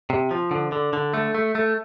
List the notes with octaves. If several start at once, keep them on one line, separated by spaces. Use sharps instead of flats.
C3
F3
D3
D3
D3
A3
A3
A3